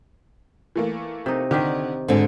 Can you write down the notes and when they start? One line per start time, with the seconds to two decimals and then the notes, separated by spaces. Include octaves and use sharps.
0.76 E3 A3 A#3
1.26 C3 D#4
1.51 D3 D#3 G4 A#4
2.08 G#2 D3 C4